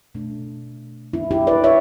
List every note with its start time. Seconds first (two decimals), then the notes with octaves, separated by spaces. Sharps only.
0.15 B2 A3 D4
1.13 F#3 B3 D4 E4
1.31 E4 G4
1.47 B4 D5
1.64 C#5 E5